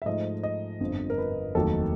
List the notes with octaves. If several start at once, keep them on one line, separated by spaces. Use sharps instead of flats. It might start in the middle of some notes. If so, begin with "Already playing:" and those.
E5
G#2 F3 A3 D#5
D#5
G1 F2 D3 F3
A#4
B4
F1 D#2 D#3 F#3 A4